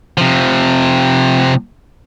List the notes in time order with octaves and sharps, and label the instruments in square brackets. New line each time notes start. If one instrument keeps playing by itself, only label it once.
[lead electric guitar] C3 F3